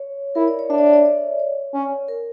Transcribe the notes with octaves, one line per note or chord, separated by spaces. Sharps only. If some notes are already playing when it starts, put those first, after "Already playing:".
Already playing: C#5
E4 A#4
D5
C#5
D4 E5
D5
C#5
D5
D5
C#5
C#4
A#4